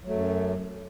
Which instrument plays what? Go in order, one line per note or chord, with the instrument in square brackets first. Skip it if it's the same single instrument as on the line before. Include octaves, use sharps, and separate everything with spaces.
[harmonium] F#3
A3
F#2